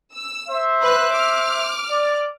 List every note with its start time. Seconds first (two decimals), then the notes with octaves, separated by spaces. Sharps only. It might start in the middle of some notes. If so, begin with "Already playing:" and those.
0.14 E6
0.48 C5 E5
0.81 B4 F#6
1.13 D6 F6
1.90 D5